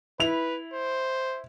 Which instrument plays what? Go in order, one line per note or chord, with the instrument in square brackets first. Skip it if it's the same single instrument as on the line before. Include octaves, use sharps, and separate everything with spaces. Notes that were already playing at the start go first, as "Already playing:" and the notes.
[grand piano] E4 F7 [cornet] B4
[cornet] C5